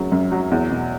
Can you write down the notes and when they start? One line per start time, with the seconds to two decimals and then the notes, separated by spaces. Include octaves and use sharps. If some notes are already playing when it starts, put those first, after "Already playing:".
Already playing: F#1 F#2 C#3 F#3
0.12 F#2
0.32 F#3
0.51 E2
0.70 B2